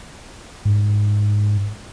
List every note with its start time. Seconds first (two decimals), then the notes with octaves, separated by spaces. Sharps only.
0.65 G#2